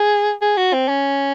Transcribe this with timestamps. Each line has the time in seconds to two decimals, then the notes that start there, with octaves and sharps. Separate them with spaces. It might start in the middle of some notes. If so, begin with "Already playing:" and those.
Already playing: G#4
0.41 G#4
0.57 F#4
0.73 C4
0.88 C#4